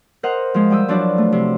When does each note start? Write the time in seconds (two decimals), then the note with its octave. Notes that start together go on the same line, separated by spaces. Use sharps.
0.23 A#4 C5 D#5 F#5 A#5
0.54 F3 G#3
0.70 G3 G5 D#6 E6
0.88 F3 F#3 D4 E4 D5
1.18 A3
1.32 C3